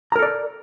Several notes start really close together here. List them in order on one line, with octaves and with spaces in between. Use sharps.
A#5 A#4 A4 D5